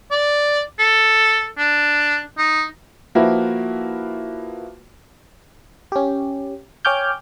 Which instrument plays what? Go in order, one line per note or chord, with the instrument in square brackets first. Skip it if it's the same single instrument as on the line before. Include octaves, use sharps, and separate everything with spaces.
[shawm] D5
A4
D4
D#4
[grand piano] F3 A#3 E4 F#4 B4
[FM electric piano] C#4 G4
C#5 G5 G#5 D6 F6 G6